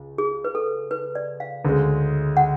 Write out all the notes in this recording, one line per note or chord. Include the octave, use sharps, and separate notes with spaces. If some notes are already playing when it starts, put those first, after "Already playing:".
Already playing: C#2
G#4
B4
A4
B4
D5
F5
D2 C#3 G#3
F#5